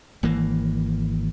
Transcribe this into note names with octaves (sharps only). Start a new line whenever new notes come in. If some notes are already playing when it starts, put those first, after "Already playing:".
G#1 E3 A#3